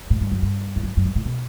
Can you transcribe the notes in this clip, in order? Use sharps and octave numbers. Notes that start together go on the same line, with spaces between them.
A2
G2
F#2
G2
E2
F#2
F#2
G2
A2
B2